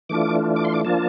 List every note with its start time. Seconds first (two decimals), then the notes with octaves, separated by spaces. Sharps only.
0.09 E3 A3 D4 F4 D6
0.56 D6
0.64 C6
0.74 D6
0.85 F3 A#3 D4 F4 A5